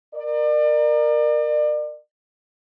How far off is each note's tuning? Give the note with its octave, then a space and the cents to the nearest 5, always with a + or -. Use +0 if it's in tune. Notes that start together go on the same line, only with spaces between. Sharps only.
A#4 +0 D5 +35